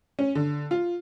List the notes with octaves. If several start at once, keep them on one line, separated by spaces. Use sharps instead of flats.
C#4
D3
F4